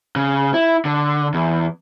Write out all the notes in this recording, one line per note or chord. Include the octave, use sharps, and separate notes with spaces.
C#3
E4
D3
E2